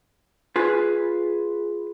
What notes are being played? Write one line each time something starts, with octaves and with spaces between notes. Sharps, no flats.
F4 G#4 B4